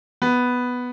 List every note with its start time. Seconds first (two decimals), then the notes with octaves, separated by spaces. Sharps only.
0.22 B3